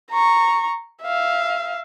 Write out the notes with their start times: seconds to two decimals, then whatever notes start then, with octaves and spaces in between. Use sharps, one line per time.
0.11 A#5 C#6
1.04 E5 F5